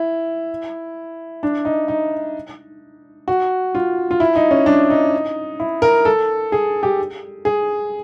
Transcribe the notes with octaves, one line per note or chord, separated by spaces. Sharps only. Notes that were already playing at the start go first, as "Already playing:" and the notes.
Already playing: E4
D4
D#4
D#4
F#4
F4
F4
E4
D#4
C#4
D4
D#4
E4
A#4
A4
G#4
G4
G#4